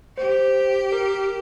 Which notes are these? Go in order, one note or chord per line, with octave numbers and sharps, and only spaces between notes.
G4 C5
A#4